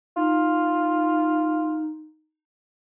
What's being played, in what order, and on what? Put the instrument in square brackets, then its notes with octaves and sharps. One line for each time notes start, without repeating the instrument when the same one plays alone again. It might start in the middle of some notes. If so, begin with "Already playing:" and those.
[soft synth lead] D#4 [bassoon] F4